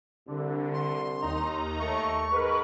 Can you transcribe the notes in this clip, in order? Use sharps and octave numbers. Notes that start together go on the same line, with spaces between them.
C2 D3
C6
D#2 D#4 A#5
A3 C#6
G#2 A#4 B4